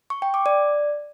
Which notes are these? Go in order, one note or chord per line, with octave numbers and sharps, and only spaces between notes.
C#6
G5
D6
D5